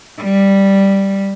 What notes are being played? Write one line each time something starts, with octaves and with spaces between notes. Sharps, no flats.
G3